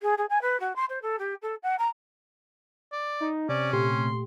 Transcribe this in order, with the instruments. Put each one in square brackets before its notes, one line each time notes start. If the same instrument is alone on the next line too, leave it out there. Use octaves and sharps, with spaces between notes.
[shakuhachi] G#4
G#4
G#5
B4
F#4
C6
C5
A4
G4
A4
F#5
A#5
[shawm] D5
[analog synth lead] D#4
[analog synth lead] C3 [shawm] C#4 [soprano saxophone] D5
[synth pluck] A#2 A3 G4 [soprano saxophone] C6